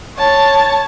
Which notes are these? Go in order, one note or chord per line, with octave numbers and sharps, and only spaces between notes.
C#5 A5